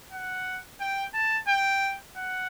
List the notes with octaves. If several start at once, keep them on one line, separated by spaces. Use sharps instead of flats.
F#5
G5
A5
G5
F#5